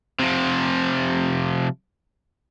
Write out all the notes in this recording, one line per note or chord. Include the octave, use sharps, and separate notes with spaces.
C3 F3